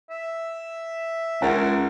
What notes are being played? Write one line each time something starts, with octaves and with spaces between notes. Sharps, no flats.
E5
C#2 A#4 C#5 F#5 A#5